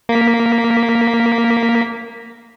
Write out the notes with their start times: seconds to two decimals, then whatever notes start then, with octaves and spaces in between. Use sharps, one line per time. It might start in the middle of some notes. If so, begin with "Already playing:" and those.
0.09 A#3 B6